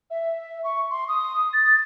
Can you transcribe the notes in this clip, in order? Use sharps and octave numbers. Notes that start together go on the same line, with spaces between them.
E5
C#6
C6
D#6
A6